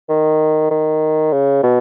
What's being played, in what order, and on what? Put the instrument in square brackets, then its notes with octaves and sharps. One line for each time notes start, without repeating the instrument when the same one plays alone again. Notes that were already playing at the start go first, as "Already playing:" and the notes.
[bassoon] D#3
D#3
C#3
B2